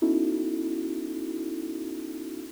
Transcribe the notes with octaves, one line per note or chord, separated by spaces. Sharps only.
B3 C#4 D#4 E4 F#4 A4